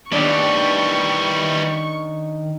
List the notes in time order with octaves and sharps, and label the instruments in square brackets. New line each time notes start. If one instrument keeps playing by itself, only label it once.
[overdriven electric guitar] D#3 C#5 [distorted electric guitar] E3 G3 [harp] D4 [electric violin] C#6